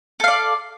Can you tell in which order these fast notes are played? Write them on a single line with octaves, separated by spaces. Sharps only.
A4 F5 D5